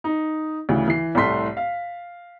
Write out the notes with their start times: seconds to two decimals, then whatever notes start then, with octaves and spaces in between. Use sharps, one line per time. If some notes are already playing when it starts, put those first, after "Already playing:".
0.04 D#4
0.69 D2 C#3 E3
0.88 E3 C7
1.15 C2 A2 A3 C6 B6
1.57 F5